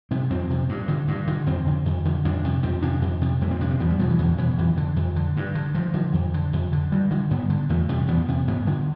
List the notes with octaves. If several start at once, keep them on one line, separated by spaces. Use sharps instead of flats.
C3 C4
F2 C4
C3
G2
D3
G2
D3
F2 C4
D3
F2
D3
F2 D4
C3
F2 C4
C3 D4
F2
C3
F2 A3
C4
C3 D4
C4
E2 B3
G3
B2 F3
E3
E2 D3
B2 E3
F2 E3
D3
F2
D3
G2
D3
G2 F3
D3
F2
D3
F2
D3
G2 G3
D3
G2 B3
D3
E2 A3
C3 G3
E2 B3
C3
G2 B3
D3